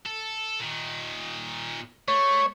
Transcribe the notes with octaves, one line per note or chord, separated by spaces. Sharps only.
A4
A#2 D#3
A3 C#5